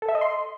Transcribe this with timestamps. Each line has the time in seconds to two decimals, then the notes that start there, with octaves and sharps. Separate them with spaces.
0.02 A4
0.09 E5
0.15 D#5
0.21 C6